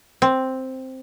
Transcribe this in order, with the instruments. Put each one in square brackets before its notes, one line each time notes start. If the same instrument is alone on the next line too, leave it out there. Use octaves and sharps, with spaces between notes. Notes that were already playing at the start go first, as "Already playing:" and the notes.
[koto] C4